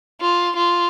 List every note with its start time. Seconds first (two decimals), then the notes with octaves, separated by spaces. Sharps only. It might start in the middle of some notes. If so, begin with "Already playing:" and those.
0.21 F4
0.56 F4